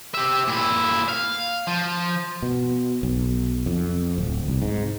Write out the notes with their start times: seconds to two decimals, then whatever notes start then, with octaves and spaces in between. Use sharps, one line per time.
0.14 G4 E5
0.48 A#2 E4
1.09 F5
1.67 F3
2.42 B2
3.03 B1
3.66 F2
4.18 D1
4.48 C2
4.62 G#2